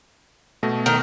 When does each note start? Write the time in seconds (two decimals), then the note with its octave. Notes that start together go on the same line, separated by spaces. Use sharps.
0.63 B2 A3 A#6
0.86 D#3